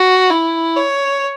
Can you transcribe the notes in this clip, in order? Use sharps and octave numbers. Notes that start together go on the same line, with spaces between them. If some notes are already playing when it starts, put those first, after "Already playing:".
Already playing: F#4
E4
C#5